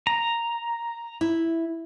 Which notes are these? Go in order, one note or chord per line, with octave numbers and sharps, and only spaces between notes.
A#5
E4